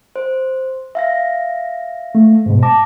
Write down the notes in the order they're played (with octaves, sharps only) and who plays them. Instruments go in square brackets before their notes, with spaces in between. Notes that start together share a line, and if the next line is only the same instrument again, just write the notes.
[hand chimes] C5
E5 F5 A#6
[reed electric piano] A3
G#2 B2
[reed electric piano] A5 [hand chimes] D6 A#6